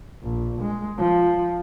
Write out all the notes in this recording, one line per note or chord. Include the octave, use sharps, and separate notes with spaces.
A#1
G#3
F3